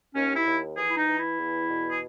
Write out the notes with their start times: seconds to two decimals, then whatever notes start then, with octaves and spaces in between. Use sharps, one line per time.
0.15 D#2 C#4
0.36 E4
0.46 D#2
0.77 E3 G#4
0.90 E4
0.97 D#4
1.08 E3
1.18 E4
1.38 E2
1.69 B2
1.91 G#4